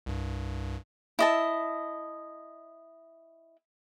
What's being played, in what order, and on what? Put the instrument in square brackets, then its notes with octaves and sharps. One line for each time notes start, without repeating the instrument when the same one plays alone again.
[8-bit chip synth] C2 G2
[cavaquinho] E4 D#5 A5